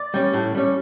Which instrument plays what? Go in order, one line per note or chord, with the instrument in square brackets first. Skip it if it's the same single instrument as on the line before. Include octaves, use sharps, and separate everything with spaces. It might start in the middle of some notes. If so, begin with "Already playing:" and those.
Already playing: [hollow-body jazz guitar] D5
G3 C#4
A2
G3 C#4